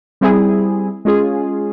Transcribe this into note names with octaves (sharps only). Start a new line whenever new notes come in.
G3 C4 E4 G#4
G#3 C#4 F4 G#4